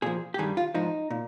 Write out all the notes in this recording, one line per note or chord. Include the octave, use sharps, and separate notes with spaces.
A#2 F3 G#4
G4
G2 D#3 G3 G#4
F4
G#2 F3 D#4
A#2